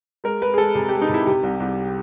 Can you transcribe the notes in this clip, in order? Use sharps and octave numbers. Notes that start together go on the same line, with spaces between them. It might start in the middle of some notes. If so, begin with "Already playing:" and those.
G#3 A#4
G#3 B4
G#4
G#3 A4
C3 G#4
G4
G#3
D#4
C3 E4
C3 G4
C2
C2